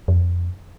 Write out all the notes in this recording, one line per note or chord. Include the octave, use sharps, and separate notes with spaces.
F2